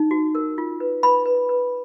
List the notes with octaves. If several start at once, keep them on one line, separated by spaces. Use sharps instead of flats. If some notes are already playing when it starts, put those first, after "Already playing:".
Already playing: D#4
F#4
A#4
F4
B4
B4 B5
B4
B4